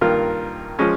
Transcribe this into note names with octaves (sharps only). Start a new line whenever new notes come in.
G2 D#3 A#3 F4 A#4
F3 G#3 C#4